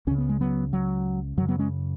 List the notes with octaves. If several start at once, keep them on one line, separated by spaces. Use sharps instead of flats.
C#2 C#3 C#4
B3
G#3
F#3 B3
F#3
F#2 C#3 F#3
F#3 B3
G#3 C#4